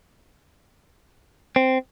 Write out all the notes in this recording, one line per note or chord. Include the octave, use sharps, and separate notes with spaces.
C4